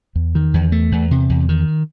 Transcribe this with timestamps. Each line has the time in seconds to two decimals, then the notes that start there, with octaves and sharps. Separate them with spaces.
0.15 E2
0.35 D#3
0.54 E2
0.72 A3
0.92 E2
1.11 C3
1.30 E2
1.49 D#3